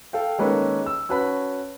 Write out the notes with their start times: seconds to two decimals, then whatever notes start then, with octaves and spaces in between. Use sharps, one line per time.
0.13 A4 F5 G5
0.38 D#3 G#3 A#3 C#4 A4 B4
0.86 E6
1.09 C#4 F#4 B4 A5 B5